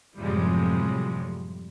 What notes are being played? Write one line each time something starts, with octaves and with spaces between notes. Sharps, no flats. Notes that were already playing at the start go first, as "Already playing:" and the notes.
F#2 A2 C3 F3 G3 G#3